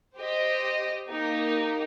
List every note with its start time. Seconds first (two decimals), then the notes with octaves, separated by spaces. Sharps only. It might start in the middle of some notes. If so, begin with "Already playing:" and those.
0.17 G4 C5 D#5
1.09 A#3 D#4 G4